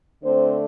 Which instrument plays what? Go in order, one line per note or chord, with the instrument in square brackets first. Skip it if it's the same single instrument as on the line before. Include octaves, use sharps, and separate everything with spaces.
[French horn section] D3 A3 C4 D4 C5